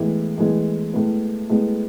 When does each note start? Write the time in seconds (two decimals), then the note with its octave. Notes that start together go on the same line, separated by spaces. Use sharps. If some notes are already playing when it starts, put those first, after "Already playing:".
Already playing: A2 E3 G#3 B3
0.38 A2 E3 G#3 B3
0.94 A2 G#3 B3
1.50 A2 G#3 B3